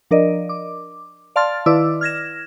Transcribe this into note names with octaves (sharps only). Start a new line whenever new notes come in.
F3 D4 A#4 D5 D#5
D6
D5 F5 A5 C6 F6 A6
D#3 E4 B4 D5 D6 E6
F6 G#6 A#6 E7